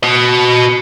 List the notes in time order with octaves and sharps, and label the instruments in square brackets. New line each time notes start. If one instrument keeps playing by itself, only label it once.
[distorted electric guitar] F#4 D#5